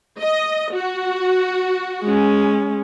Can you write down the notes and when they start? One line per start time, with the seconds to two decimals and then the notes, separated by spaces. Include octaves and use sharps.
0.21 D#5
0.75 F#4
2.03 G#3 C#4